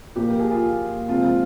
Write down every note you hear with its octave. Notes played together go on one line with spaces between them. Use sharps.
A#2 F3 A#3 G4
A#4
G#4
F4
C3 F3 G#3 C4 F4
F4